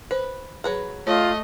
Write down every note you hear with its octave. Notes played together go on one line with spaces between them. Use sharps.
B4 C5
F#3 G#4 B4 A#5
A3 F4 C#5 D#5